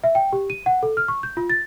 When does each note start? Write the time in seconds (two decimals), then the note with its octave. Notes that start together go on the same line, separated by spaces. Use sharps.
0.04 E5
0.15 G5
0.33 G4
0.50 D#7
0.66 F#5
0.83 A4
0.97 F6
1.08 C#6
1.23 G6
1.37 F4
1.50 A6